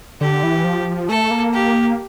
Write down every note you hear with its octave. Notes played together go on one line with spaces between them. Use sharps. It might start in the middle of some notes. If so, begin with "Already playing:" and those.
D3 G4
E3
F3
A3 A4
A#3
G4